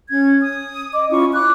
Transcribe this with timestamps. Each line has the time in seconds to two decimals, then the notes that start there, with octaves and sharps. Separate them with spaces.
0.09 C#4 G#6
0.41 D#6
0.92 D#5 D6
1.10 C#4 E4 F4 C#6
1.33 D6 F#6